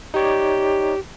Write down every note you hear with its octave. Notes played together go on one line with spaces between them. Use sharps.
D#4 G4 C#5 D5